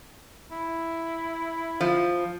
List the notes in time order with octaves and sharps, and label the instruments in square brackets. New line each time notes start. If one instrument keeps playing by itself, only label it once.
[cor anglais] E4
[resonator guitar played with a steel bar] F3